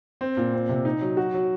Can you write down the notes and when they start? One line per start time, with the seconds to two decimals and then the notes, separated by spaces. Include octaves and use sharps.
0.21 C4
0.37 A#2
0.53 C4
0.69 C3
0.85 D#4
1.01 F#3
1.17 F#4
1.34 F#3